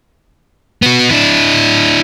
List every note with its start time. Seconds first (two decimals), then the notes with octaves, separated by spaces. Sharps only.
0.82 B3 F#4
1.10 D4 E4